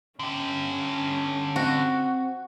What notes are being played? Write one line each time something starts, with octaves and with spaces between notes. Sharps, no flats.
D3 C#4 G4
C4 F#4